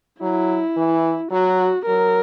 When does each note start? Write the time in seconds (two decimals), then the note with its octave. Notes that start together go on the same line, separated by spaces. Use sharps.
0.22 F#3 E4
0.77 E3
1.31 F#3 F#4
1.87 F#3 A#4